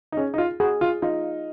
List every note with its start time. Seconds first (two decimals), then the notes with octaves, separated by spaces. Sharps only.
0.12 D#4
0.17 C#4 G#4
0.34 D#4
0.38 F4
0.60 F#4 G#4
0.81 F4
1.02 D#4 F4